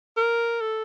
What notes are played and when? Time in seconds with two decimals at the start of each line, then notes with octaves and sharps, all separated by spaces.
0.17 A#4
0.61 A4